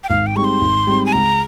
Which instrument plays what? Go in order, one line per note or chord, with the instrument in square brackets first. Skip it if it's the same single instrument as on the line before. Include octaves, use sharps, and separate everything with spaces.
[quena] G5
[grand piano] G#1 [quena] F5
[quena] G5
[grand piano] G#2 G3 C4 [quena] C#6
[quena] C6
[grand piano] G#1
G#2 G3 C4
[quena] G#5
[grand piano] C#2 [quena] A#5